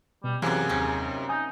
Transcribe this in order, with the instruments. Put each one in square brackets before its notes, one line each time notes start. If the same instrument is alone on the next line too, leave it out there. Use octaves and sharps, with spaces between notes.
[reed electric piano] B2 [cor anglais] G3
[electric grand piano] F#2 C3 [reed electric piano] E3 [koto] A#3 B3 [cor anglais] G#4
[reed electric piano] D#2 [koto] C4 C#4 D#4
[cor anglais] D#4 [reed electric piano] G#5 D#6 G6